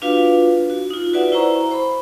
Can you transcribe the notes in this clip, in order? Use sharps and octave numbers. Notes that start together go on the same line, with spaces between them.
D4 F4 F#4 B4 F5
F#4
D#4 F4
F#4 B4 D5 E5 F#5
E4 C5 E5 A#5 C#6
C5 B5